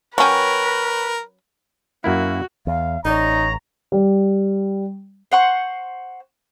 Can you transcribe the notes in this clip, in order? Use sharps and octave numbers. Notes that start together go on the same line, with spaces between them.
F#3 C#4 A#4 B4 C#5 G5
F#2 A#3 E4 F#4
E2 F5
A1 D#4 C#5 D5 A#5
G3
C5 F#5 C#6